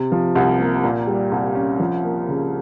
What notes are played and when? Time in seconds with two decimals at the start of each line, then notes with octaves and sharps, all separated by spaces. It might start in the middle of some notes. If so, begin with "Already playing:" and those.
Already playing: C3
0.12 F3
0.35 C2
0.60 A#3
0.84 A#2
1.07 G3
1.32 C2
1.55 C#4
1.80 F3
2.04 A#3
2.28 C#3